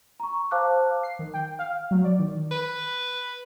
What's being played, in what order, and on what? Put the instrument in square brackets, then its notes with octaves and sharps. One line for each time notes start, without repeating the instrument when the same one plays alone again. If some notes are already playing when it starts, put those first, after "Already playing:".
[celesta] A#5 C#6
C5 F5 A5 D6 F6 F#6
[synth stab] C7
D#3
G5
F5
F#3
D5
D#3
[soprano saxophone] B4